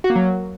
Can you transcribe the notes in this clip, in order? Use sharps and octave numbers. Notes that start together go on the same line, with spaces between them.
F#4
A#3
F#3